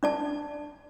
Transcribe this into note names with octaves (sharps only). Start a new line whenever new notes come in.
D4 D5 A5